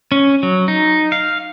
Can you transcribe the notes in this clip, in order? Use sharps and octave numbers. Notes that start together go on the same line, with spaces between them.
C#4
F#3
D#4
F5